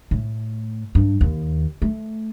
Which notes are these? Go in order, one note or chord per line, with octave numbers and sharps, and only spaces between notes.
A2
G2
D#2
A3